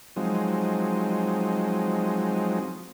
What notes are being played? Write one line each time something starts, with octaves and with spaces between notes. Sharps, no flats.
F3 F#3 G#3 C4 D#4